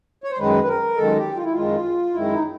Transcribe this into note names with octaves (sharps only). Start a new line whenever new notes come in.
C#5
C5
F#2 D#3 G#3 B4
B4
A#4
F#2 D#3 G#3 A4
G4
F4
E4
F#2 D#3 G#3 F4
F#2 D#3 G#3 E4
D#4